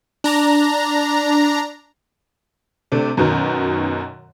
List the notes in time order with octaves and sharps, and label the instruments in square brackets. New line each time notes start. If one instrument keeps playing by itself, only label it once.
[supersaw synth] D4 A#5
[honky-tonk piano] C3 A3 D4
F#2 B2 D#3